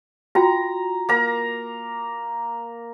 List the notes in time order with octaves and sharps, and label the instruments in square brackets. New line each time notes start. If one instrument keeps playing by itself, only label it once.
[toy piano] F4 F#4 G5 [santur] A#5
[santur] A#3 A#5